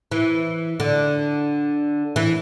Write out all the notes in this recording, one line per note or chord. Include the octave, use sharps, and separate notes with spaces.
E3
D3
E3